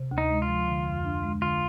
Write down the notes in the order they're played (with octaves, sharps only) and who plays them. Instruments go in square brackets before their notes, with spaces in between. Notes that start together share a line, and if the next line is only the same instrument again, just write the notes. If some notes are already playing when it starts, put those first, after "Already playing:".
Already playing: [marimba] C3
D2
[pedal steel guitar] D#4
[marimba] G#3
[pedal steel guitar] F4
[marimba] F3
D3
F2
D4
G#3
[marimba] D3 [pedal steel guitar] F4